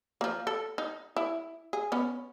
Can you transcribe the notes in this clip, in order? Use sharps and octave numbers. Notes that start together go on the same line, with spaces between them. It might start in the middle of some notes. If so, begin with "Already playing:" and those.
F3 A#3
A4
D#4
E4
G#4
B3 C#4